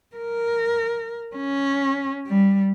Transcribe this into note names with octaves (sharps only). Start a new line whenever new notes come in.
A#4
C#4
G3